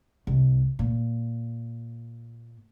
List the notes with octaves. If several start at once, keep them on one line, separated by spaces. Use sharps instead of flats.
C2
A#2